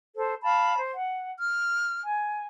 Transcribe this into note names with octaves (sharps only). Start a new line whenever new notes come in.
A4 C5
F5 A5 B5
C5
F#5
F6
G#5